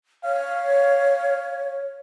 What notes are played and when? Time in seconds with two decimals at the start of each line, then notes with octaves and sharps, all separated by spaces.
0.24 C#5 F5